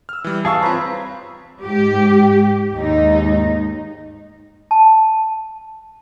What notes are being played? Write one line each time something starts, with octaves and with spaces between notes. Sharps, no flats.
E6 F6
E3 G3
G#4 F5 A5 C#6 E6
C4 F4 B4 C#5 A#5 B5
G#2 G4
D#2 G#2 D#4
A5